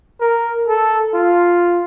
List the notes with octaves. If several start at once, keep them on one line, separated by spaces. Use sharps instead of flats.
A#4
A4
F4